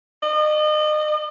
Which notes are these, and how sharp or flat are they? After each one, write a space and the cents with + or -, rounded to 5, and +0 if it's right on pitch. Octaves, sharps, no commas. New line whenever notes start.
D#5 -35